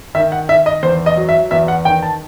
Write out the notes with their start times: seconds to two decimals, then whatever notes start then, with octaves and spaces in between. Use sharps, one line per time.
0.15 D#3 E5
0.32 F#5
0.49 D#3 E5
0.66 D#5
0.83 E2 C5
1.06 D#5
1.17 F#3
1.29 E5
1.51 E2 E5
1.68 F#5
1.85 D#3 G5
2.03 A5